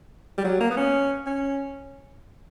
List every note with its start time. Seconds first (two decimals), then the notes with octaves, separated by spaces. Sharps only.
0.38 G3
0.44 F#3
0.60 A#3
0.71 B3
0.77 C#4
1.26 C#4